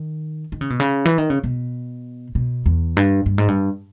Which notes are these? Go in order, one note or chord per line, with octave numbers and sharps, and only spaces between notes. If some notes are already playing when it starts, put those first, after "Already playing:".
Already playing: D#3
D#3
C#3
B2
C#3
E3
D#3
C#3
B2
B2
E2
G2
G2
G#2
G2